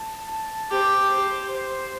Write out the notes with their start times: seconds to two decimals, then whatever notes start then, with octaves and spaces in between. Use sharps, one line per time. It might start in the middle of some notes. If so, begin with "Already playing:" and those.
Already playing: A5
0.31 A5
0.71 G4 C5
1.12 C5
1.52 C5